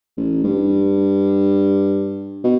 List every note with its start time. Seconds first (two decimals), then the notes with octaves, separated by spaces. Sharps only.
0.17 A1
0.44 G2
2.44 B2